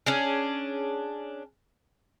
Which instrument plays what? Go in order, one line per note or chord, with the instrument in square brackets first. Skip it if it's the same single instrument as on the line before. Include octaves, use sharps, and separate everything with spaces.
[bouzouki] C#4 D4 G#4